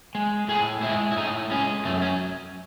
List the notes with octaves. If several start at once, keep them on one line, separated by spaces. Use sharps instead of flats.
G#3
A2 G#4
G#3 E4
E4
A2 D#4
G#3 C#4
F#2 A3
C#4